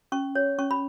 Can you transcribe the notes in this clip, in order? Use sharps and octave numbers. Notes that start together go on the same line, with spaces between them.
C#4 C#6
C#5
C#4 C#6
B5